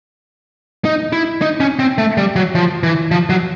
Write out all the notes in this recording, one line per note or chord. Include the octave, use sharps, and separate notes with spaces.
D#4
E4
D#4
C#4
C4
A3
G3
F#3
F3
E3
F3
F#3